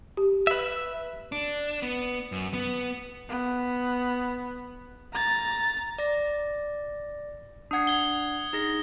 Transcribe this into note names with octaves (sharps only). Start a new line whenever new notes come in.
G4
B4 E5
D4
B3
F#2
B3
B3
A#5 A6
D5 A#6
D4 F#5 D#6 G#6 C7
G#6 G7
D#4 G#4 A#6